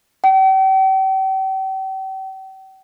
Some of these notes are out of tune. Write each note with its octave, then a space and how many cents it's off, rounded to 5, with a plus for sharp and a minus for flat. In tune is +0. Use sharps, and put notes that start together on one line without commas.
G5 -40